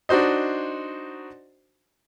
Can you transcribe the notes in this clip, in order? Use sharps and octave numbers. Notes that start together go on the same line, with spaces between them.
D4 D#4 F#4 C5 D#5